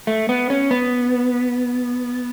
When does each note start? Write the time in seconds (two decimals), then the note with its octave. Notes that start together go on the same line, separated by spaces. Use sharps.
0.07 A3
0.29 B3
0.50 C#4
0.71 B3